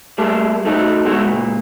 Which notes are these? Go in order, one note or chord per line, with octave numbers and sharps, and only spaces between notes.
G3 A3 A#3 G#4 A5
A3 D#4 F#4 A4
B2 G#3 A3 F#4
C#2 A#2